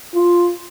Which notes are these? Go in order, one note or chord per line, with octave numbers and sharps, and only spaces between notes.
F4